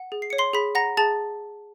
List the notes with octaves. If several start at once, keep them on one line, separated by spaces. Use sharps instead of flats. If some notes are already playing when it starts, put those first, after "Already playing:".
Already playing: F#5
G#4
C7
C#5 C#7
C6 C7
G#4 B5 B6
F#5 A#5 A#6
G#4 A5 A6